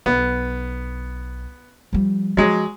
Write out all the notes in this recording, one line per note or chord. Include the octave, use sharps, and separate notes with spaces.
B1 B3
F3 G3
F3 F#3 G#3